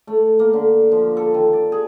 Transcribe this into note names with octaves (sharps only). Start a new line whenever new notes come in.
A3
A#3
D3
F3
A4
D#3
D5
G#4